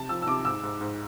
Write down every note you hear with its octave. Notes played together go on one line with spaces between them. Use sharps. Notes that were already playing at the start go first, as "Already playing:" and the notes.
Already playing: C3 A5
F3 E6
E6
C3 D6
G#2 E6
G#2
G#2